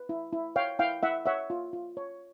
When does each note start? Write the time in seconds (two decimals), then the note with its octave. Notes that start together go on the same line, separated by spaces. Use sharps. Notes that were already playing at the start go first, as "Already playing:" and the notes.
Already playing: B4
0.09 E4
0.33 E4
0.56 C#5 F5 G5
0.79 E4 F5 G5
1.03 E4 E5 F#5
1.26 C#5 E5 F#5
1.50 F4
1.73 F4
1.97 C#5